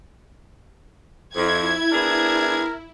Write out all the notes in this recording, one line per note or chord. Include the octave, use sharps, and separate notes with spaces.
F2 E4 G#6
B3 D4 G#4 A#4